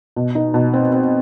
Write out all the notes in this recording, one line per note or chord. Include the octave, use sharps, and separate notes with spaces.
B2
D#4
B2
C4
C4